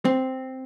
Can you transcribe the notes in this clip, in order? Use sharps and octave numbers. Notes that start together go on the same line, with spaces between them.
C4